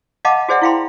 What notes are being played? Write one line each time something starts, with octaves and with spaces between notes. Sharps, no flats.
D#5 F5 F#5 A5 B5 D6
F#4 G#4 C5 D5 E5 F#5
E4 F#4 F5 G5 B5 C6